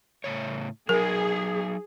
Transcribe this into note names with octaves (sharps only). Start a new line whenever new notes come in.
A2 C#3 C#5
F#3 D#4 G#4 A#4